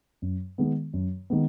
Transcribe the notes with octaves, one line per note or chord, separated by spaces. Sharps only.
F#2
D#3 G#3 B3
F#2
D#3 G#3 B3